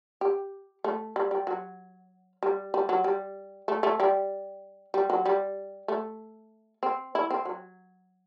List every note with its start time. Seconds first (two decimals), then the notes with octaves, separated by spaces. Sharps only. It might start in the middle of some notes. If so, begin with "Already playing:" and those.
0.21 G4
0.84 A3
1.16 G3
1.31 G3
1.47 F#3
2.43 G3
2.74 G3
2.89 F#3
3.04 G3
3.68 A3
3.83 A3
4.00 G3
4.94 G3
5.10 F#3
5.26 G3
5.88 A3
6.83 C4
7.15 E4
7.30 C4
7.45 F#3